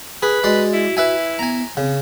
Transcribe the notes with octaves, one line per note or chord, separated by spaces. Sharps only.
G#4 B4
G#3 F#4 D5 C6
E4
E4 B4 E5 G#5
B3 G#5 A#5
C#3 C4